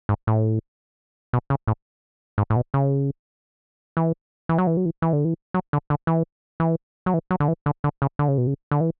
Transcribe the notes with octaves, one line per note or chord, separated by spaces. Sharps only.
G#2
A2
B2
C#3
A2
G#2
A2
B2
C#3
E3
E3
F#3
E3
F#3
E3
E3
D3
E3
F#3
D3
D3
E3
E3
F#3
E3
F#3
D3
E3
D3
D3
C#3
D3
C#3
B2
C#3
D3
E3